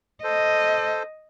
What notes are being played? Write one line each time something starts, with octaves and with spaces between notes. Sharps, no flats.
A4 C5 D#5